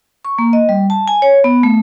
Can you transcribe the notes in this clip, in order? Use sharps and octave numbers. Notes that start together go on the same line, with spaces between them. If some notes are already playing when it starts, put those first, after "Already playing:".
C#6
A#3
D#5
G3
A5
G#5
C#5
B3
A3